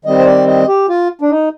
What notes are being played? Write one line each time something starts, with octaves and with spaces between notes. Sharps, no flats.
D#3 G3 C4 D#5
C5
D5
D#5
G4
F4
D4
D#4